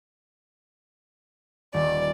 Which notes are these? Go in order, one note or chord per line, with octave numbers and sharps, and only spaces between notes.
D#1 D5